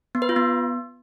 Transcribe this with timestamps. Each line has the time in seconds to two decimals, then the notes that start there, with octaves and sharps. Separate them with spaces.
0.15 B3
0.22 B4
0.29 F4
0.36 B3